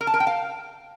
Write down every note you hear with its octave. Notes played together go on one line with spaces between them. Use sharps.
A#4
A5
A#4
G5
F5